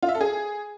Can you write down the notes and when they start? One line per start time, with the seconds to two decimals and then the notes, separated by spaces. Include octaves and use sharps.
0.03 F4
0.09 E5
0.15 A4
0.21 G#4